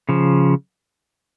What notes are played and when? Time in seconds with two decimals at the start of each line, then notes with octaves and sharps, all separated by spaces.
0.09 C#3 F3